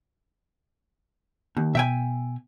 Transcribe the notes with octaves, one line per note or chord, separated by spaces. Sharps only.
D#2 D#3
B2 E5 G5 G#5